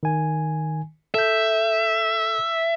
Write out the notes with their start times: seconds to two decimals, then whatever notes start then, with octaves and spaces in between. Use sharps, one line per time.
0.03 D#3 G#5
1.14 A4 E5 G6